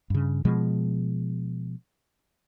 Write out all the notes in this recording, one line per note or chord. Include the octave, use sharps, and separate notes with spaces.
G2 C#3
B2 F3 G#3